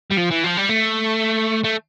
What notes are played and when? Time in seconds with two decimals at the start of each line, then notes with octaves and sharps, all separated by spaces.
0.11 G3
0.17 F3
0.30 E3
0.44 F3
0.57 G3
0.69 A3
1.64 A3